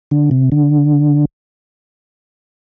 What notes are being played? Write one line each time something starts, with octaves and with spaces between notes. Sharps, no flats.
D3
C3
D3